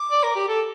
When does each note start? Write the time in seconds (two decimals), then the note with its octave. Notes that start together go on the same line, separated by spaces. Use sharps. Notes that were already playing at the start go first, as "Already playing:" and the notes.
Already playing: D6
0.11 D5
0.23 A#4
0.35 G4
0.48 A4